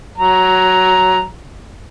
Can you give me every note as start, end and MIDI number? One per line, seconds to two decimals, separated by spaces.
0.18 1.24 54
0.18 1.24 82